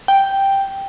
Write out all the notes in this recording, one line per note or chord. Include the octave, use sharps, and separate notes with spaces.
G5